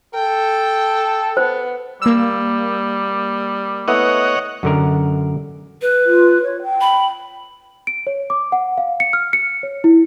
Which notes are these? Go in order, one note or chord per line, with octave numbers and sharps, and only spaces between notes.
A4 G5
B3 C5
G3 A#3 E6
A3 B3 E4 C#5 D#5 F#5
F#2 D3 A#4
B4
F4
C#5
G5
B5
D7
C#5
D6
F#5
F5
C#7
F6
C#7
C#5
E4